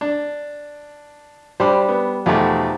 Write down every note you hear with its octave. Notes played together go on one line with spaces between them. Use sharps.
D4
G3 D4 C5 B5
B3
E2 B2 F3 A3 D#4 G4